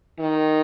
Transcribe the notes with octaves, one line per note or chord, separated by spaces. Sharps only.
D#3